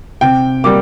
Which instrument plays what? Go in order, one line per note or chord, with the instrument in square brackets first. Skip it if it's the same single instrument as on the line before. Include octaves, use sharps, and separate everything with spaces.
[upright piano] C3 G5
G3 A#3 D6